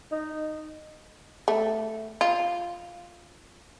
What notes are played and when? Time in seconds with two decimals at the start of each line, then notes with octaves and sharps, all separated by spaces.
0.12 D#4
1.48 A3
2.21 F4